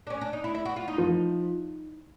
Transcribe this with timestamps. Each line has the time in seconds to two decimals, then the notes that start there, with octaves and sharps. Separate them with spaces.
0.07 D4
0.10 C#4
0.21 D4
0.33 D#4
0.44 E4
0.55 E4
0.65 F#4
0.76 F4
0.88 D#4
0.98 F3